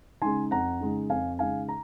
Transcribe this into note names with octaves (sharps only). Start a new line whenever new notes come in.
C#3 G#3 D#4 G#5 C6
F2 F#5 A#5
C#3 G#3 D#4
F2 F5 G#5
C#3 G#3 D#4 F5 G#5
A#5